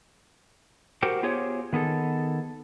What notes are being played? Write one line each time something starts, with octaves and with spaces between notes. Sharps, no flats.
F#4 G4 A#4 C5 F#5 G5
B3 F4 G4 G#4 C5 C#5
D#3 B3 G#4 A4